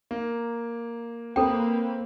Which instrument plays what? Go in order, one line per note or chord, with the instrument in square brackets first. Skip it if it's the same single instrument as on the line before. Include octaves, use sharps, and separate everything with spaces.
[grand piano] A#3
[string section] A#3 B4 [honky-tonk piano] C4 [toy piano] A4 G5